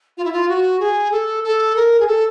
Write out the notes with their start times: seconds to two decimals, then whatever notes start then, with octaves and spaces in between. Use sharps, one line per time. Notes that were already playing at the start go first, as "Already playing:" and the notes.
0.17 F4
0.24 E4
0.32 F4
0.48 F#4
0.80 G#4
1.11 A4
1.44 A4
1.75 A#4
2.00 G#4
2.07 A4